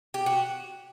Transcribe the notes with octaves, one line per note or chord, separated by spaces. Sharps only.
G4
F#4